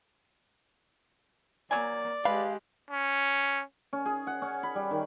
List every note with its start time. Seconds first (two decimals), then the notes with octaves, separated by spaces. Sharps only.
1.71 F#3 A#3 D5 G#5
2.25 G#3 G4 B4 F5
2.91 C#4
3.93 C#4
4.05 G#4
4.27 F#5
4.42 C#4
4.63 B5
4.75 G3
4.91 D#3